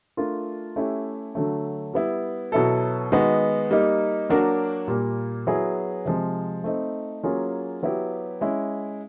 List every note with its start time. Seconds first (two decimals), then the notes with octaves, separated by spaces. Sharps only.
0.17 A3 D4 F4 A#4
0.76 A3 C#4 E4 G4
1.35 D3 F#3 A3
1.93 G3 B3 E4
2.52 B2 F#3 B3 E4 A4
3.12 D#3 G#3 B3 D#4 F#4
3.70 G3 A#3 D#4
4.29 F#3 A#3 D4 F#4 A#4
4.88 A#2 G3 A#3
5.47 F#3 B3 E4 G#4
6.05 C3 F3 G#3
6.64 A3 C4 D#4
7.23 F#3 A#3 C#4 F4 G#4
7.83 F#3 B3 E4 G4 B4
8.41 G#3 C#4 E4